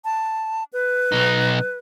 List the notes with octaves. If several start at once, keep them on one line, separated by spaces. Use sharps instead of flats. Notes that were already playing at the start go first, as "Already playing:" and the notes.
A5
B4
B1 D#4